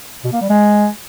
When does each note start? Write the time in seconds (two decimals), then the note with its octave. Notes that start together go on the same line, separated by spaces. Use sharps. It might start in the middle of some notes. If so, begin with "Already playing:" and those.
0.24 B2
0.33 A#3
0.41 G3
0.50 G#3